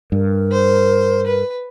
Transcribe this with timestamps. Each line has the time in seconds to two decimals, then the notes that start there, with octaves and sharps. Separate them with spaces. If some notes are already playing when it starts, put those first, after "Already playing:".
0.12 G2 A#4
0.52 C5
1.26 B4